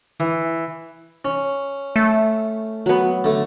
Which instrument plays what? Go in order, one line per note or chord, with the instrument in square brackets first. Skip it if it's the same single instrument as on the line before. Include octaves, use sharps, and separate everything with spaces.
[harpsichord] E3
C#4
[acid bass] A3
[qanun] F#3 B3
[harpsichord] D3 A3